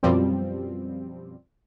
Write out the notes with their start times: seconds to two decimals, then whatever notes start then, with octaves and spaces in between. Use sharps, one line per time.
0.03 F#2 B2 F3 G3 C4